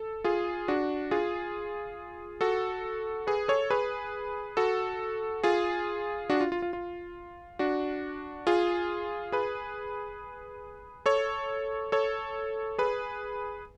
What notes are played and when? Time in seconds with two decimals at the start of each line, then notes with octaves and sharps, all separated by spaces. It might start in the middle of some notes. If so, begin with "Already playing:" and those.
Already playing: A4
0.24 F4 G#4
0.68 D4 F#4
1.11 F4 G#4
2.41 F#4 A4
3.27 G#4 B4
3.48 A4 C#5
3.70 G#4 B4
4.57 F#4 A4
5.44 F4 G#4
6.30 D4 F#4
6.41 F4
6.52 F4
6.62 F4
6.73 F4
7.59 D4 F#4
8.47 F4 G#4
9.32 G#4 B4
11.06 A4 C#5
11.92 A4 C#5
12.78 G#4 B4